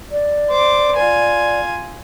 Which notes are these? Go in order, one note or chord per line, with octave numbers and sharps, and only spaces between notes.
D5
C5 D6
F4 G#5